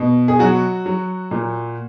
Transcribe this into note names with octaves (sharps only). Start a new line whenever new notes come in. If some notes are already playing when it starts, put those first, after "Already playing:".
Already playing: B2
G#4
F#3 F#4
F#3
A#2